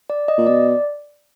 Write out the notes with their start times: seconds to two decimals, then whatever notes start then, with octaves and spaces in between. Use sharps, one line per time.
0.10 D5
0.28 D#5
0.38 A#2
0.46 B2 D5